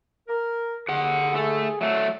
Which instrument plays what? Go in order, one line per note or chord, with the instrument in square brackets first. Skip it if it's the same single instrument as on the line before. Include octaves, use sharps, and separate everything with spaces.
[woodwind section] A#4
[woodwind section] D#2 D3 [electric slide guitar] G#4 F#5
[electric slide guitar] A3 A4 [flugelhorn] G#4
[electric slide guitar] F#3 A3 [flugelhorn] E5